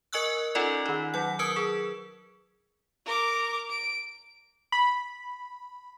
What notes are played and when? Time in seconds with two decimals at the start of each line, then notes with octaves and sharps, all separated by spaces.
0.13 A#4 D#5 G#5 C#6 E6 F#6
0.55 C#4 D#4 F4 A4 D5
0.86 D#3 D#4
1.14 F#3 F#5
1.39 A#4 B4 D#6 E6 G#6
1.56 G#4
3.06 A#4 D6
3.70 D7
4.72 B5